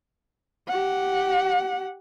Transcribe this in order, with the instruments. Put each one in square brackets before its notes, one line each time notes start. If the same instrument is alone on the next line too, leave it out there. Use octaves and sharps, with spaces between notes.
[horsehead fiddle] G4 F#5